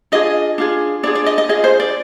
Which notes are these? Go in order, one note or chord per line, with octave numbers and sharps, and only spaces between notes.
D4 F4 G#4 D#5
D4 F4 G#4
D4 F4 G#4 D5
D5
D#5
D#5
D4 F4 G#4 D#5
C5
D5